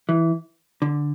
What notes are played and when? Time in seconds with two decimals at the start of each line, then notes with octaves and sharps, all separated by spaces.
0.09 E3
0.82 D3